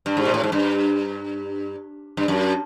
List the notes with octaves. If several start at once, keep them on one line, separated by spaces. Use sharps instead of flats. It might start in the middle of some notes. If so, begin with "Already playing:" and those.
G2
G#2
A#2
A2
G#2
G2
G2
F#2